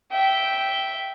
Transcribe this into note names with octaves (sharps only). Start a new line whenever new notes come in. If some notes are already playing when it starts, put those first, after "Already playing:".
E5 G5